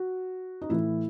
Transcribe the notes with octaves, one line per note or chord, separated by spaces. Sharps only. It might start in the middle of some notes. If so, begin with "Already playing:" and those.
Already playing: F#4
D#4
A2 E3 E4